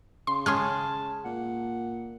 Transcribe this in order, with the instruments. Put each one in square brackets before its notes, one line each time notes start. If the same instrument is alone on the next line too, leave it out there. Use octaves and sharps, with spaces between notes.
[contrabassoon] C#3 [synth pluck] C6
[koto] G#3 C#4 G#4 [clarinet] A5 [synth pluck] C6 F6
[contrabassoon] A#2 [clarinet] F#5